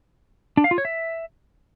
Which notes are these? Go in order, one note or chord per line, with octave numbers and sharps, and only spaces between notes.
D4
F5
F4
C#5
E5